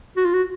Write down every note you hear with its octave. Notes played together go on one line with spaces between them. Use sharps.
F#4
F4
F#4